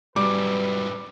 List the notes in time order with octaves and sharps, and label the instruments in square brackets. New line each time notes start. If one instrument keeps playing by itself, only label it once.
[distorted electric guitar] G#2 F#3 [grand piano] G3 [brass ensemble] B4 [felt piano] D6